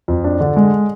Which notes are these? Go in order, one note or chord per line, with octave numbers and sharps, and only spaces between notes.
F2
D4
D3
G#3